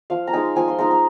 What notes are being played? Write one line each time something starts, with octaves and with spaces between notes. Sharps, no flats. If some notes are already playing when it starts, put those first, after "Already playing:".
F3 F5
A#5
G#3 D#4 G#5
F3 G#5
C6
G#3 D#4 A#5
A#5